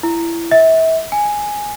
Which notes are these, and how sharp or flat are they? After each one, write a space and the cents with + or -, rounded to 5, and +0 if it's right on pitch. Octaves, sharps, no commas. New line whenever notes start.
E4 +25
E5 -30
G#5 +0